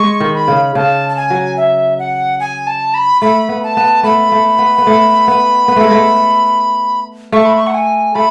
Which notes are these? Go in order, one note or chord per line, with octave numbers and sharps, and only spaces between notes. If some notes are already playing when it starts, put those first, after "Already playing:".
Already playing: G#3 C#6
D#3
B5
C#3
C#3 A5
A5
G#5
F#3
E5
F#5
G#5
A5
B5
A3 B5
B3
A5
B3
A3 B5
A3
B3
B3
A3
B3
B3
A3
G#3
A3
A3 C#6
B5
C#6
F#5
G#5
A3 B5